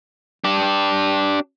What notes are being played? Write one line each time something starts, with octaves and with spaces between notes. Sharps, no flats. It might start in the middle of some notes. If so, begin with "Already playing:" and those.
D4 G4